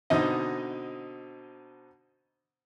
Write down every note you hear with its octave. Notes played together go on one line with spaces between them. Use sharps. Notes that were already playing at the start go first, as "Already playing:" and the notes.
B2 D3 C4 D#4 D#5